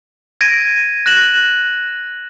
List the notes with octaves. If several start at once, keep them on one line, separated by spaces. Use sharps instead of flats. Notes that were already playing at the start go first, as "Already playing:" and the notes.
G#6 A#6 D7 D#7
F#6 A#6 E7 F#7